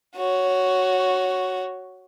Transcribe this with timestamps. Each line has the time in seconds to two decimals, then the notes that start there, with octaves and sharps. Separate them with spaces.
0.16 F#4 C#5